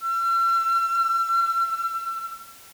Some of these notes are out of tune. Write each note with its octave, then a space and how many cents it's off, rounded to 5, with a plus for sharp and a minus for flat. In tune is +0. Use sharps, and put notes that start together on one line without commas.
E6 +45